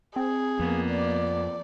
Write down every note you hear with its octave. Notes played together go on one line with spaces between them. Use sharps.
C4 G#4
F2 A#3 B3
D5